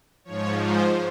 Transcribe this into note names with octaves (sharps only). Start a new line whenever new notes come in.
G#2 F3 C#5
C5